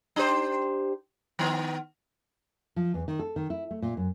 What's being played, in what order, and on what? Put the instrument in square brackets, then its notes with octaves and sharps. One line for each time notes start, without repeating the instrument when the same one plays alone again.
[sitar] D4 G4 C5
D#3 B3
[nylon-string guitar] F3
E2
D#3
A4
D#3
E4
A3
A#2
F#2